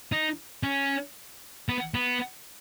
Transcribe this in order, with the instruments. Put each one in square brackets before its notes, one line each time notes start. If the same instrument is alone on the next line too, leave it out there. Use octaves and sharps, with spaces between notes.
[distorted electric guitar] D#4
C#4
B3
B3